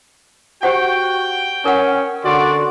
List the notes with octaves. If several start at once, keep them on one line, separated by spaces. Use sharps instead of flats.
F#4 G4 C5 F#5 G5
C#4 A#4 F#5
D3 F#4 D5 C6